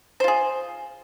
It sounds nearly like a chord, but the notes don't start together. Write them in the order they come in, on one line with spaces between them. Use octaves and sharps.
C5 F4 G#4